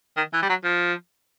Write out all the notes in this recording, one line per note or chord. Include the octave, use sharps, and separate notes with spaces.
D#3
E3
G3
F#3
F3